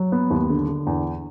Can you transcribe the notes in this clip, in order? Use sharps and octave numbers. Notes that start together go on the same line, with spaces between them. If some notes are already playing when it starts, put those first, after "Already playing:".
Already playing: F#3
B3
D#2
D3
D3
E2